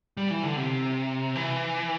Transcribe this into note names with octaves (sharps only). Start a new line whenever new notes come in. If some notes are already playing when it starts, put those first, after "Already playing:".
G3
E3
D3
C3
E3